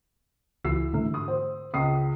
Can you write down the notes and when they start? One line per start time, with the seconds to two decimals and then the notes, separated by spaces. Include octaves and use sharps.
0.65 C#2 E3 E6 C7
0.93 G#2 D3 A3
1.14 D#6
1.28 C5
1.74 C#2 D#6 C7